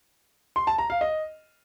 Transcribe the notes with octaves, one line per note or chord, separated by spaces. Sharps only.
C6
A5
A#5
F5
D#5